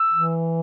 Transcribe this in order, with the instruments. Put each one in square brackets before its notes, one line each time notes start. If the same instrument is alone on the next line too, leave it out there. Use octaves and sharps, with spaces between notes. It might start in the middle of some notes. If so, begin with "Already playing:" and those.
Already playing: [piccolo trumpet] E6
[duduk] E3